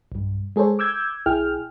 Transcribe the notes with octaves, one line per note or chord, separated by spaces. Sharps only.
B1 G2
G#3 G#4 A4 C5 C#5
D6 E6 G6 G#6
B1 E4 G#4 G5 F6